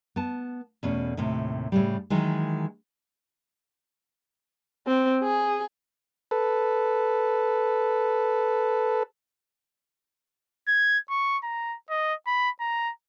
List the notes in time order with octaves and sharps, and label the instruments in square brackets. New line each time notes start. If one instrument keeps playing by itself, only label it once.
[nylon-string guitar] B3 A5
E2 B2 A3 C#4
D#2 A2 C3
A2 C#3 G3
D#3 E3 F#3 G#3
[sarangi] C4
G#4
[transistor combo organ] A4 B4
[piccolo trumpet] G#6
C#6
A#5
D#5
B5
A#5